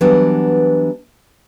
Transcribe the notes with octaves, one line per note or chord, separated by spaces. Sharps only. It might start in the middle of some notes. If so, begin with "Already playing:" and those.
E3 F#3 G3 B3 D4